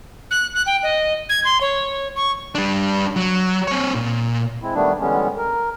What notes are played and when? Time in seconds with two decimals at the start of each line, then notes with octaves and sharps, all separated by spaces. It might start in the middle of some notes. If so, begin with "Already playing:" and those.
0.31 F#6
0.54 F#6
0.66 G5
0.83 D#5
1.29 G#6
1.45 C6
1.61 C#5
2.16 C#6
2.55 G3 D4
3.16 F#3
3.68 C4 C#5
3.95 A#2
4.62 G#3 C4 E4
4.74 D#3 G3 A3 B3 D4
5.00 D3 E3 G3 G#3 B3 C#4
5.37 A#4